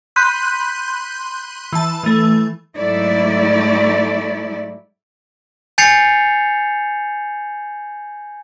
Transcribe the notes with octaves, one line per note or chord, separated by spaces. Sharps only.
B5 C6 F#6 G6 B6 D#7
E3 A5
E3 A3
G#2 F#3 A3 E4 D5
G#5 G6 A6 C7 C#7 F7